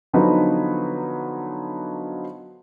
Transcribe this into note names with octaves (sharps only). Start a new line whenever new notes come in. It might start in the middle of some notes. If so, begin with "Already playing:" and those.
D3 F3 F#3 B3 D#4 B4